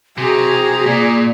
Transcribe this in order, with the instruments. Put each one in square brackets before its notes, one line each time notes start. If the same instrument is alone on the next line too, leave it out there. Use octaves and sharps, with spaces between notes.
[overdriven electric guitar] C3 [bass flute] F#4 [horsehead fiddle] G#4 A#5
[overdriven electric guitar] A#2 [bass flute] D5